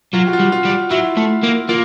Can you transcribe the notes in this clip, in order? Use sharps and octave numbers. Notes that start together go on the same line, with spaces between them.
F#3 F4
F#4
F4
G3
F4
G3
F#3 E4
A3
A#3
A#3 F4